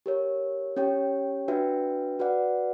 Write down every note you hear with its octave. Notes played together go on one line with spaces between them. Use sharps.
G4 A#4 C#5
C#4 G4 C#5 G5
D4 F#4 B4 E5 G5
F#4 B4 D5 F#5